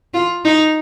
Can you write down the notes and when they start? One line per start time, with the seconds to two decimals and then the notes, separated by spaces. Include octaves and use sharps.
0.14 F4
0.45 D#4